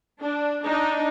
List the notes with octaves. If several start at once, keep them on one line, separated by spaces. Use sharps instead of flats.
D4
D4 D#4